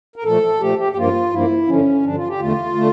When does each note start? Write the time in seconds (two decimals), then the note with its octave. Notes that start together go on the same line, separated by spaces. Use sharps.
0.16 A#4
0.24 A#2 F3 A3 A4
0.60 A#2 F3 A3 G4
0.79 G4
0.92 G4
0.96 G2 F3 A#3 F4
1.31 G2 F3 A#3 E4
1.68 G2 D3 F3 C#4
2.03 G2 D3 F3 D4
2.16 F4
2.28 G4
2.39 E2 D3 A3 F4
2.75 D3 A3